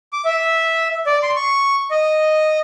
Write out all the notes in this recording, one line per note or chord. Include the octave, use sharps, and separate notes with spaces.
D6
E5
D5
C6
C#6
D#5